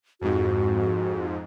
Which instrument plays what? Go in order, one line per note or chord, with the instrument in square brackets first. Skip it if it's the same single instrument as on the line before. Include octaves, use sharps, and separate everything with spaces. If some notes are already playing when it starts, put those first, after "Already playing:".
[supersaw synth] F2 G#2 [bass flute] F#4